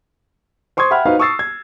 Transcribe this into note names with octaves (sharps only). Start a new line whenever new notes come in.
C5 C6 C#6 D#6 G#6
E5 F#5 G5 B5 F6
D#4 F#4 B4 C5 F5
C#6 D#6 E6 A6 C7
G#6